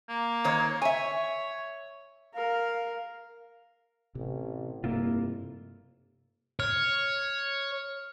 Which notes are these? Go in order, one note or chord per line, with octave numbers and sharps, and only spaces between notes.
A#3
D#3 C5 C#5
C#5 E5 G#5
A#4 F5
A1 C3
F1 G2 C3 A#3 E4 F4
C#5 F6